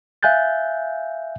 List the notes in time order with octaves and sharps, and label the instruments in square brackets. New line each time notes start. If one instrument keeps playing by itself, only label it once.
[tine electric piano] E5 F5 G#5 F#6 G6 A6